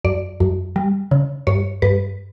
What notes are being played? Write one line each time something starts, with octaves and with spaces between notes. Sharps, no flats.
F#2 D5
F#2
G3
C#3
G2 C#5
G2 B4